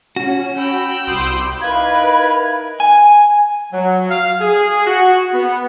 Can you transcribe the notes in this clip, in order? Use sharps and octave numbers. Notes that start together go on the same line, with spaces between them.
C#4 F#4
G5 B5 E6
C2 C6 D6 D#6
D#4 E4 A#4 B4 F5 G#6
G#5
F#3
F5
G#4
F#4
B3